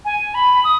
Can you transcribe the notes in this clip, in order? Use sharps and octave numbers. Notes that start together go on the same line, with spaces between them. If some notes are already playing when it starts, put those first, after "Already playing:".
G#5
B5
D#6